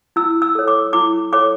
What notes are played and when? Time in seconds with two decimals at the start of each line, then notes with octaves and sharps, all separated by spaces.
0.16 E4 E6
0.42 E6
0.55 A4 C#5
0.68 D6
0.93 E4 D6
1.33 A4 C#5 D6